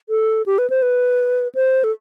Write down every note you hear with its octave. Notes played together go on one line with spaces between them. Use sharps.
A4
G4
B4
C5
B4
C5
A4